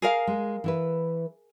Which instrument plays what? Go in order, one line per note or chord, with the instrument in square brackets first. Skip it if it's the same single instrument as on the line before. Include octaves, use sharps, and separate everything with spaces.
[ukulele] G#4 A#4 F5
[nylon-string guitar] G#3
E3 E4 B4